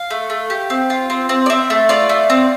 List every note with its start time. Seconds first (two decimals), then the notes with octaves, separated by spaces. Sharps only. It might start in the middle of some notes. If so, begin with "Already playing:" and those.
Already playing: F5
0.10 A3
0.30 A3
0.50 G4
0.70 C4
0.90 F4
1.10 C4
1.29 C4
1.46 D5
1.50 C4 E5
1.70 A3
1.89 F4 D5
2.09 A3
2.30 C4